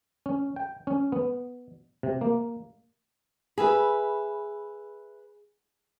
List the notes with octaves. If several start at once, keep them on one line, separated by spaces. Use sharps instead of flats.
C#4
G5
C#4
B3
C3
A#3
G#4 B4 E5 B5